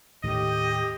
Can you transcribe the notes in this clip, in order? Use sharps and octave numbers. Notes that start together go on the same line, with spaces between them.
D#2 A2 D#3 G4 D#5